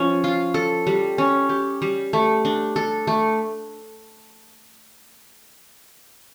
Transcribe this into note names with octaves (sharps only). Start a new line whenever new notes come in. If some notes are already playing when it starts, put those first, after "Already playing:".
Already playing: F3 C#4
F4
A4
G3
C#4
G4
G3
A3
D4
A4
A3